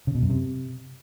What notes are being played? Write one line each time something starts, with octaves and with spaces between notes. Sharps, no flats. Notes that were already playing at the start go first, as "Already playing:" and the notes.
C#3
B2
F#2
C3